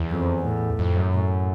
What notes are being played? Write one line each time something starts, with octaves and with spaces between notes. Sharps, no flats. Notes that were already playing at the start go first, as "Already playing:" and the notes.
Already playing: E2
F2
A2
F2
F#2
A2